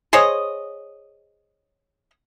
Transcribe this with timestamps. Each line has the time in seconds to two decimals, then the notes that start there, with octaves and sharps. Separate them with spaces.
0.13 G#4 C5 C#5 D#5